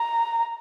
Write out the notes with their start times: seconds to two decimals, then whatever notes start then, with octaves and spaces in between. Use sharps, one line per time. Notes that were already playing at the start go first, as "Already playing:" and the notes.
Already playing: A#5